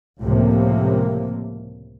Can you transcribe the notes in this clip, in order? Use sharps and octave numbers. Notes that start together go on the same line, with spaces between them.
C#2 A2 C3 F3 A#3